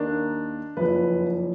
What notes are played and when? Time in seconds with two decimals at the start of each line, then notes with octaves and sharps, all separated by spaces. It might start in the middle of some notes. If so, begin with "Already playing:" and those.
Already playing: D#2 D#3 A#3 D4
0.77 F#1 F2 F3 B4